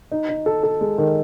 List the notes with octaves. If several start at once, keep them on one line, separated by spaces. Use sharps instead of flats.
D#4
D#4
A4
A4
G#3
D#3